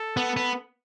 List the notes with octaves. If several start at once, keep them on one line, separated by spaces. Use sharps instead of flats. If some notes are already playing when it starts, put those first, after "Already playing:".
Already playing: A4
B3
B3